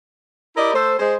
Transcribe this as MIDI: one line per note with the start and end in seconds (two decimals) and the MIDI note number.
0.56 0.72 64
0.56 0.72 67
0.56 0.72 70
0.56 0.72 74
0.56 0.72 75
0.73 0.94 57
0.73 0.94 69
0.73 0.94 72
0.99 1.15 56
0.99 1.15 72